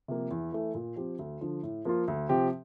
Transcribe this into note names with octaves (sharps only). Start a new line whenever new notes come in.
C3 F3 A#3
E2
E3 A3
A#2
F3 C4 G4
D2
D3 F3
A2
F3 A#3 F4
D2
C3 F3 C4 G4